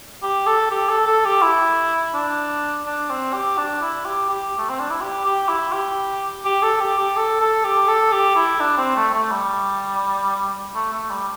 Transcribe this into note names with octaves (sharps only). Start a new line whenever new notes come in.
G4
A4
G4
A4
A4
G4
E4
D4
D4
C4
G4
D4
E4
G4
G4
A3
C4
D4
E4
G4
G4
E4
G4
G4
A4
G4
G4
A4
A4
G4
A4
G4
E4
D4
C4
A3
A3
G3
A3
A3
G3